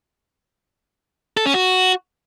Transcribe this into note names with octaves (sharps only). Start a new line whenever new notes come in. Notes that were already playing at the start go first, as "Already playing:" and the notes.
A4
C#4
F#4